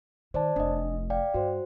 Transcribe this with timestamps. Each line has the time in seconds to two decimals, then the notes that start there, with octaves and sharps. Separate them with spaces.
0.34 D#3 C5 D5 A5
0.56 F1 D4 D#5
1.10 D5 F5 G5
1.34 G2 F#4 C5